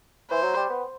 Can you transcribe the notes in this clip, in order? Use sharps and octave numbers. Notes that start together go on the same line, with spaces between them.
E3 C5
F#3
G3
B3